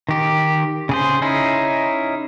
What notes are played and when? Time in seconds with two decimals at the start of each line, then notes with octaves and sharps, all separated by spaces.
0.09 D#3 G4
0.89 C#3 G#4 C5
1.22 C#4 D#4 E4 G#4